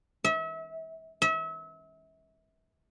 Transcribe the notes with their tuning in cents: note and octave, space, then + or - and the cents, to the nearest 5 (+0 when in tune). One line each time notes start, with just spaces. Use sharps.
E5 -35
E5 -35